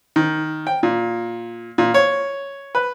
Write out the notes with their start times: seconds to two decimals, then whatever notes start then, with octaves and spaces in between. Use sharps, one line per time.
0.16 D#3
0.67 G5
0.83 A#2
1.78 A#2
1.94 C#5
2.75 B4